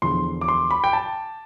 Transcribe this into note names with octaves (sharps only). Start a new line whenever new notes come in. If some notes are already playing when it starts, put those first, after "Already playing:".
E2 D3 F3 C6
D6
C6
B5
G5
A5